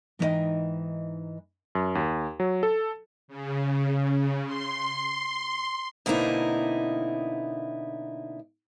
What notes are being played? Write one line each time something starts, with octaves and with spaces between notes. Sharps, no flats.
G#2 E3 D#4 G4 D#5 G5
F#2
D#2
F#3
A4
C#3
C6
B2 D3 A#3 C4 D#4 E4